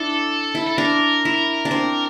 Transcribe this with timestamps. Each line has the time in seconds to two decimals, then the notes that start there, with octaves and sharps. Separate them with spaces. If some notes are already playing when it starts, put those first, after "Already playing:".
Already playing: D4 E4 A4
0.55 E4
0.67 A4
0.78 D4 A#4
1.25 E4
1.65 D4
1.71 C4